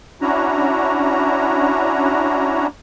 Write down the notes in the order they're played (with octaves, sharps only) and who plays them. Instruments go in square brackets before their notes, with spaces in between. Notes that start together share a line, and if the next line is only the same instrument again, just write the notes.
[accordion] C#4 D4 E4 F#4 A#5